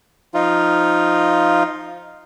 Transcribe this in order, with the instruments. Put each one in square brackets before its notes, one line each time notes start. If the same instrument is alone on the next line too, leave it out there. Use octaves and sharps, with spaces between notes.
[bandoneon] F3 D#4 F4